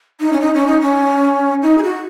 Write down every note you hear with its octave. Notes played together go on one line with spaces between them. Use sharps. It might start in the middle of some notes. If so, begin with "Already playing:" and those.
D#4
C#4
D#4
C#4
D#4
C#4
D#4
G#4
F#4